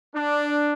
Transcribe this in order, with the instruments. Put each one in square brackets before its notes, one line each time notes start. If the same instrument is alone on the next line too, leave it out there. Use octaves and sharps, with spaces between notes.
[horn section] D4